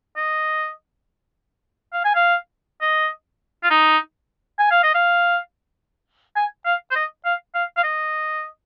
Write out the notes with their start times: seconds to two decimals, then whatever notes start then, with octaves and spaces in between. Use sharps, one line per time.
0.16 D#5
1.93 F5
2.05 G#5
2.15 F5
2.82 D#5
3.64 F4
3.71 D#4
4.59 G#5
4.71 F5
4.83 D#5
4.95 F5
6.36 G#5
6.66 F5
6.91 C5
6.96 D#5
7.25 F5
7.55 F5
7.77 F5
7.84 D#5